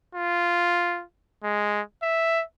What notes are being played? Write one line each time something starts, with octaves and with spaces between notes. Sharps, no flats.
F4
G#3
E5